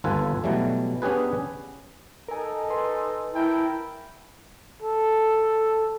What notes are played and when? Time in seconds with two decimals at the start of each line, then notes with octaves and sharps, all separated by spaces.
0.04 G1 D#2 F4 A4 B4 G#5
0.44 B2 E3 F#3 G3 A3
1.02 B3 C#4 D4 G4 G#4 B4
2.28 D#4 A4 A#4 G#5
2.70 B4 G#5 C6
3.34 E4 A#4 G5 A5
4.82 A4